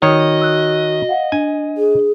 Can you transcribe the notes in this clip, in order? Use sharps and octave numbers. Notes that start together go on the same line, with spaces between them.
D#3 F#4 C#5 D#5
E6 F#6
F5 F#5
D4 G#5
G#4